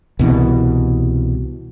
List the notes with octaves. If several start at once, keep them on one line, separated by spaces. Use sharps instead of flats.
C2 B2 E3